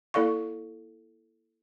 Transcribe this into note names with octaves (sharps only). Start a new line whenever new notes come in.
A#3 E4 A4 D5 F5 C#6